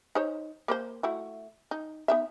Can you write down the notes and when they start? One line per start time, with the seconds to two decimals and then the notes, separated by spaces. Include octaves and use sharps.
0.15 D#4 C5 C#5
0.68 A#3 B4 C5
1.03 A3 E4 F#4
1.71 D#4
2.08 B3 D#4 E5